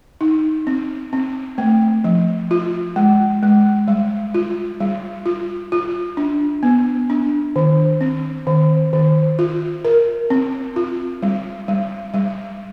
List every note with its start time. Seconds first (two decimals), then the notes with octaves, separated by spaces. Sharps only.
0.21 D#4
0.67 C4
1.13 C4
1.58 A3
2.04 F3
2.51 F4
2.96 G#3
3.43 G#3
3.88 G3
4.34 F4
4.80 G3
5.26 F4
5.72 F4
6.17 D4
6.63 B3
7.10 D4
7.56 D#3
8.01 C4
8.47 D#3
8.93 D#3
9.39 F4
9.85 A#4
10.30 C4
10.76 F4
11.22 G3
11.68 G3
12.14 G3